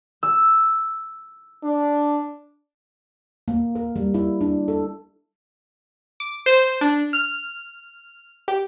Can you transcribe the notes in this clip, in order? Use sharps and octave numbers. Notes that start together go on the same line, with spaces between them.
E6
D4
A#3
A#4
G3
E4
D4
A4
D6
C5
D4
F6
G4